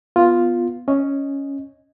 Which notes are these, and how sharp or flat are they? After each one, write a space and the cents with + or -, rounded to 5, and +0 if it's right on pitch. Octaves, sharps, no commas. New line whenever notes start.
B3 +0 F4 +0
C#4 +0 D#5 +0